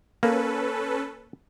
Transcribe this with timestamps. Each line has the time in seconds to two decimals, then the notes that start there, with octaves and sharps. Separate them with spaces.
0.23 A#3 C#4 A4 B4